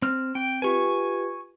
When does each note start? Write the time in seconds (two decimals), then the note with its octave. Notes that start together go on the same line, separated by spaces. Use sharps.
0.02 C4 F6
0.35 C4 G5
0.62 F4 G4 B4 G#5 C#6